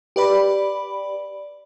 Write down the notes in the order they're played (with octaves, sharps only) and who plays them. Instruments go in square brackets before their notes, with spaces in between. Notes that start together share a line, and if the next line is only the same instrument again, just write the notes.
[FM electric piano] G4 B4 D5 B5